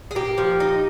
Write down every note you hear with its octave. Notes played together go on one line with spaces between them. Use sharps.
G#4
A#3 G4
F3
D#4